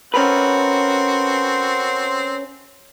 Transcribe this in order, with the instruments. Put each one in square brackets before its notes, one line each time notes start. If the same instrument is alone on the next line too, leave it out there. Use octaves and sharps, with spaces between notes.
[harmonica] C4 F#4 C6 [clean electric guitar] C#4 A#4 B4